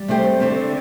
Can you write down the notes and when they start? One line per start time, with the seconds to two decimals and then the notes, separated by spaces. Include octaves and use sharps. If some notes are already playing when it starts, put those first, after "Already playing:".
Already playing: G3
0.08 C3 A3 C4 G4 C5
0.40 D3 A3 C4 G4 C5